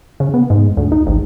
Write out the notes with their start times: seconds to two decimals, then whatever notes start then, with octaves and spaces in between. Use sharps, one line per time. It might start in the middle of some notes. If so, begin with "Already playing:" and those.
0.20 C#3
0.34 B3
0.50 G#2
0.77 D2
0.92 D#4
1.07 G#1